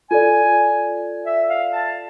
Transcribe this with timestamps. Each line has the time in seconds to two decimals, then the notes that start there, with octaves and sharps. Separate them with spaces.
0.10 F4 A4 D5 G#5
1.26 E5
1.50 F5
1.73 A5